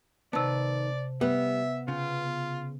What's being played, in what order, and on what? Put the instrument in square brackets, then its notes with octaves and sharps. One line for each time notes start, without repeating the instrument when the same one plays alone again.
[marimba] C3 A5 [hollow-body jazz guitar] D#3 B3 [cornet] D5
[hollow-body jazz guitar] G3 [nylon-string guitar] B3 [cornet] E5
[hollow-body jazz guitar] C#3 [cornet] F4